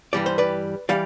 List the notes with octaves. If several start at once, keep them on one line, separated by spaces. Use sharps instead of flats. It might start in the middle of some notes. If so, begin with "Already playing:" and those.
G2 E3 G3 D5
C5
B4 D5
E3 G3 D5 F5